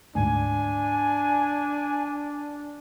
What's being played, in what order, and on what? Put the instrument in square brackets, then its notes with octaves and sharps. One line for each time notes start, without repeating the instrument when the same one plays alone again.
[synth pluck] D2 G#2 [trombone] D4 [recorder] G#5